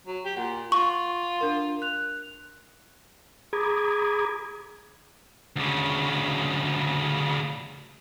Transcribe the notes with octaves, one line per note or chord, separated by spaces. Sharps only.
F#3
G4
A#2 F#5
F4 C#6
D4 A#4 C6
F#6 F7
G#4 A#5 B5 D6 D#6 G#6
D2 C#3